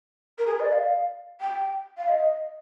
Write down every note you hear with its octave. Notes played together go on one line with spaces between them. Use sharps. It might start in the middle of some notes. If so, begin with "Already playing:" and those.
A#4
G#4
A#4
D#5
D5
F5
G5
F5
D#5